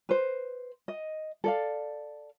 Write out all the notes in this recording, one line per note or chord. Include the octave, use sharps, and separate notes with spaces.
B4 C5
D#5
A4 D5 F5